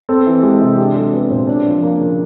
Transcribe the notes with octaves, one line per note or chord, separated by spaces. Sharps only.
C4 A4
E3
G#3 G4
C3
D4 G4
F#3 A4
B3 B4
A#2 C5
D4 C#5
F3
A#3
C#3